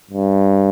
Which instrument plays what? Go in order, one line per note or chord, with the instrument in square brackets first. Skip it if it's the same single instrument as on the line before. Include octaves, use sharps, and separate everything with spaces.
[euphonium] G2